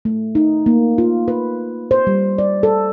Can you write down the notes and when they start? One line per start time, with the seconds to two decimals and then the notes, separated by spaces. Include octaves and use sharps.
0.05 A3
0.35 D#4
0.66 A#3
0.98 F4
1.28 B4
1.91 C5
2.07 G3
2.38 D5
2.63 A4